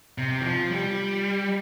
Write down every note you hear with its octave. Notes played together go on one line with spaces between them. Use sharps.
C3
E3
F3
G3